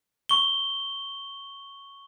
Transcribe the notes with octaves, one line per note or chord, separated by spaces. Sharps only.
C#6 G7